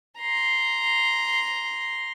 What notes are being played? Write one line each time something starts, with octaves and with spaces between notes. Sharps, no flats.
A#5 C6